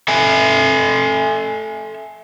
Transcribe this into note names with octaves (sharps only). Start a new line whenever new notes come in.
A4 E5 G#5